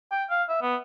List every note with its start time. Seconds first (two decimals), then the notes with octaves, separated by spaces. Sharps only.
0.11 G5
0.30 F5
0.49 E5
0.61 B3